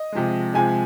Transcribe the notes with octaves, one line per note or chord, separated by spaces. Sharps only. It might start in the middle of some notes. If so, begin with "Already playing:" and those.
Already playing: D#5
C3 F3 G#3
C3 F3 G#3 G#5